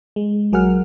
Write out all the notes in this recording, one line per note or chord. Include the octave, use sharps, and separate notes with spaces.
G#3
A#1 F#3 G#4 A#4 F#5 F6